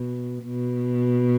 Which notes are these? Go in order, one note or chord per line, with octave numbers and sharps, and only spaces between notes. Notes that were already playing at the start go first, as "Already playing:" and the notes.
Already playing: B2
B2